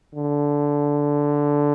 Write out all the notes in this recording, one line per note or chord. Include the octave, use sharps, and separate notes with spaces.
D3